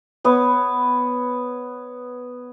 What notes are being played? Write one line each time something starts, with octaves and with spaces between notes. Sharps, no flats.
B3 C#5